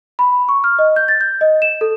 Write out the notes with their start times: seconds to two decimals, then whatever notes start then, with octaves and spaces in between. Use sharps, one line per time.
0.19 B5
0.49 C#6
0.64 F6
0.79 D#5
0.96 G6
1.08 A6
1.21 G6
1.41 D#5
1.62 E7
1.81 A4